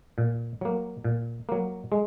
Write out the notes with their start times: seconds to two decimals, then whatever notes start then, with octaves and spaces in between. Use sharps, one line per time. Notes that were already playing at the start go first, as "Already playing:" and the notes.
0.18 A#2
0.61 F#3 A#3
1.04 A#2
1.49 F#3 A#3
1.92 G#3